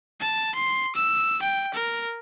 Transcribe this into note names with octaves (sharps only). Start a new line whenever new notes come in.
A5
C6
E6
G5
A#4